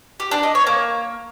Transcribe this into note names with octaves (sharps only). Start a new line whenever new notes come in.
G4
D4
D#5
C#5
A#3